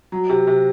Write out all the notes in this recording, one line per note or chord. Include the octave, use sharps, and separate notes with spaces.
F#3
C3
C3